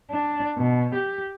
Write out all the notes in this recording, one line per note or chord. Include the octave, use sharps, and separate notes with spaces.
D4
B2
G4